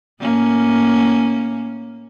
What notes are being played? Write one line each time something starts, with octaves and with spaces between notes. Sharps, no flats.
A2 A#3 C#4